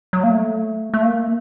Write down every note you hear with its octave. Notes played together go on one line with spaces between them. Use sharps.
F#3
A#3
A3
A3
A#3